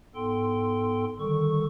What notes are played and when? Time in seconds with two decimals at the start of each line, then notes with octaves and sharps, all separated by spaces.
0.15 G#2 B3 A4 G5 C6
1.19 D3 D#3 G3 A4 C#6